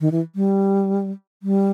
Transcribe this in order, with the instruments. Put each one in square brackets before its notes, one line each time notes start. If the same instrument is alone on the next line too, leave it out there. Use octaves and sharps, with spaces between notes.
[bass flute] D#3
E3
G3
G3